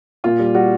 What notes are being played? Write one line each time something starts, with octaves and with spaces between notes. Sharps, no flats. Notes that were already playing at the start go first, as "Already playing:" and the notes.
A#2 F4
G3
G3 F#4